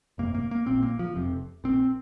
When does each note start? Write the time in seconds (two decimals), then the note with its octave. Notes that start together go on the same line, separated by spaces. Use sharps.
0.18 G1 F2 C3 A#3
0.35 A#3
0.51 A#3
0.66 A#1 A#2 C4
0.83 A#3
0.99 F3
1.15 F1 F2 C3
1.64 A#1 A#2 C4